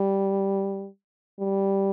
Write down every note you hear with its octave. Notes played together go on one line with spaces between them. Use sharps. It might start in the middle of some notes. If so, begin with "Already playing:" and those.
Already playing: G3
G3